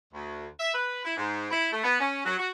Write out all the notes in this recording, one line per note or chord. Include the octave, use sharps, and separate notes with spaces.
D2
E5
B4
E4
G#2
E4
A3
B3
C#4
F#3
F#4